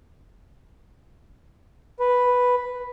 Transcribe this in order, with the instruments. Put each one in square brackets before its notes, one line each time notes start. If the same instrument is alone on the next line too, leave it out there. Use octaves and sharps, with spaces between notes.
[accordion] B4